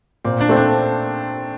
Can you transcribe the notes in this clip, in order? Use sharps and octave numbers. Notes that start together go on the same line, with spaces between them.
A#2 C4
D4
A3 C4
D4